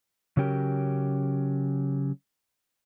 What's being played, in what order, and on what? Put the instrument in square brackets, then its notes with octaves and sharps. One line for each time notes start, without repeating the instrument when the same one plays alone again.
[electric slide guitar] C#3 F#3 C#4 G4 A#4